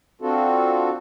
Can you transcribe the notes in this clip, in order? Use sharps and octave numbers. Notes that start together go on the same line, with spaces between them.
C4 D4 F4 F#4 A4